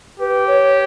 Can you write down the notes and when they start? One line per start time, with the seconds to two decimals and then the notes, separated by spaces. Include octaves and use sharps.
0.20 G4 B4
0.47 C#5